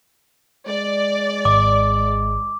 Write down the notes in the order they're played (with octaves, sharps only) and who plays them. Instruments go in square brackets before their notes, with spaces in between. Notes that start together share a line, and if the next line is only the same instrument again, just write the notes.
[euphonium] G#3 [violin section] D5
[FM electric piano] G#1 [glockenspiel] D6